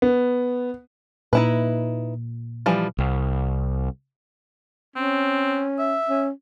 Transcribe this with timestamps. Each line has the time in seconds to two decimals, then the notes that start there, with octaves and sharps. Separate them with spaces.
0.02 B3
1.33 A#2 D#4 E4 B4
2.66 E3 F3 G3
2.98 C2
4.96 C4 C#4
5.79 E5
6.09 C#4